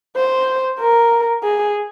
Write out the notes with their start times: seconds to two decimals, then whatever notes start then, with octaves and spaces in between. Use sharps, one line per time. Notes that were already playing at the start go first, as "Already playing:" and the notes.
0.16 C5
0.80 A#4
1.43 G#4